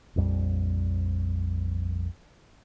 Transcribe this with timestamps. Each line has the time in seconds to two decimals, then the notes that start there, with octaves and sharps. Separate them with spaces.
0.16 A#1 F2 G3